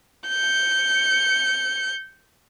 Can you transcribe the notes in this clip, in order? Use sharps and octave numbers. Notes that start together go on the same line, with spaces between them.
G6 C#7